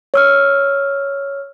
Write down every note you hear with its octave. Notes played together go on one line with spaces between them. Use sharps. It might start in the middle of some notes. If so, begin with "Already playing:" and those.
C#5 E6 F6